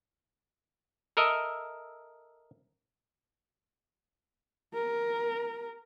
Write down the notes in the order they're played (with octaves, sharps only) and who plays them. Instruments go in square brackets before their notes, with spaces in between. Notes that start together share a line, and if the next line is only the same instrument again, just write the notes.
[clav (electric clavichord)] A4 A#4 D#5 E5
[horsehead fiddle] A#4